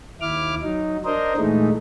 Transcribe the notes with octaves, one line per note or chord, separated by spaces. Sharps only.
D#2 E4 D6 F6
F#3 D#4
D4 A#4 C5 D#5
A#2 E3 G#3 A3 D#4